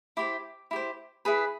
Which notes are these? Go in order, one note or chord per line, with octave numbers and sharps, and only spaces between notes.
E4 G4 C5 D6
E4 G4 C5
E4 G#4 B4